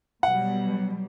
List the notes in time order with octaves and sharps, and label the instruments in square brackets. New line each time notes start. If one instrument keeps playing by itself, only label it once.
[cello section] B2 F#3 G3 [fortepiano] F#5